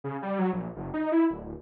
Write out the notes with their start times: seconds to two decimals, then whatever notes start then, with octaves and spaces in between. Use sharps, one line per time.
0.04 C#3
0.22 G3
0.39 F#3
0.53 A#1
0.76 F#1
0.94 D#4
1.12 E4
1.30 D1